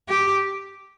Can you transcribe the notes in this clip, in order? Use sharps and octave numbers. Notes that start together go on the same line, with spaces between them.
G4